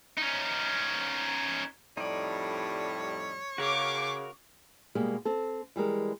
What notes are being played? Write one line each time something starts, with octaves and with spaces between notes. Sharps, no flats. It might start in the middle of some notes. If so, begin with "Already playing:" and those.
C#4 D#4
F2 A2 G3 D#4 C#5 D5
C#3 F#4 A#4 F5 C#6 D6
B2 G3 G#3 A#3
C4 A4
E3 G3 G#3 A#4